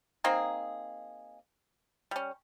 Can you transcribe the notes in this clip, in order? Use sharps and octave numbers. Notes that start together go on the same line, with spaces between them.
A#3 C4 D#4 G#4
G3 C#4